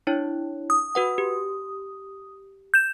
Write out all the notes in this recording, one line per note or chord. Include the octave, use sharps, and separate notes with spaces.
D4 E4 C#5
D#6
F#4 B4 F#5
G4
G6 E7